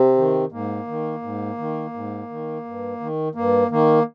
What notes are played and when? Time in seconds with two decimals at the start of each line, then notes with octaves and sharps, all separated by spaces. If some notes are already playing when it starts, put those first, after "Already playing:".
Already playing: C3 C4
0.17 D#3
0.52 G#2 A#3
0.87 D#3
1.23 G#2
1.58 D#3
1.94 G#2
2.30 D#3
2.65 G2
3.00 D#3
3.35 G2 A#3
3.71 D#3 A#3